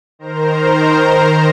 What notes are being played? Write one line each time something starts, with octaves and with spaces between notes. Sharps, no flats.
D#3 A#4 C5 A#5